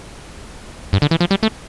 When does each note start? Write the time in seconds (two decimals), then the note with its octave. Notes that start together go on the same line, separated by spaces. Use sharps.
0.93 G2
1.02 D3
1.11 E3
1.21 F3
1.31 G3
1.43 A3